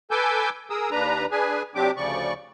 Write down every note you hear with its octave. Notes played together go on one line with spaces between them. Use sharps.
A4 B4 G#5 D6 E6 G6
G#4 A#4 D#6 E6
D#2 D4 B4 A#5
D4 G#4 B4 G#5
C3 F#3 C4 D4 G4 D6
D2 C#3 F3 D5 C#6